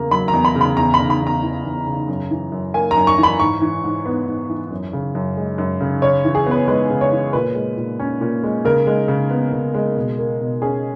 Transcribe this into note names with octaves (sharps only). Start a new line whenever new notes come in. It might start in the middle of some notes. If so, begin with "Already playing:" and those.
Already playing: E2 C#3 A#3 A#5
F#3 B5
A#5
E2
B5
C#3
B5
E2 A#5
B5
C#3
B5
E2
A#5
E3
E2
C#3
F#2
E3
F#2
A#3 G#5
A#5
F#2
C#6
E3
B5
G#2 C#6
E3
G#2
B3
G#2
E3
F#2
C#3
F#2
G#3
F#2
C#3
C#3 C#5
E3
G#4
B3 B4
G#3 B4
C#3
C#5
E3
A#2 B4
G#3
A#2
C#4
A#2
G#3
C#3 A#4
G#3
C#3
B3
C#3
G#3
B2
A#3
B2
C#4 G#4